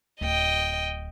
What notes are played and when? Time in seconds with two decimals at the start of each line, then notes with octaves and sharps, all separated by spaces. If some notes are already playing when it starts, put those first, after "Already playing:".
0.21 D1 D#5 G5